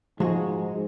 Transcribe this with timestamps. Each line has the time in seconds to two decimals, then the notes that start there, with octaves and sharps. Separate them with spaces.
0.20 G#2 F3 G#3 F#4 G#4